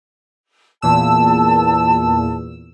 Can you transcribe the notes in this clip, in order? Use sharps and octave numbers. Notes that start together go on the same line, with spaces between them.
E2 A#2 A5 E6